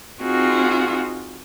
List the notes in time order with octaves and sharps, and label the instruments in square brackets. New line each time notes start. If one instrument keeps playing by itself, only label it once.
[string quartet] C4 D#4 F4 F#4 G#4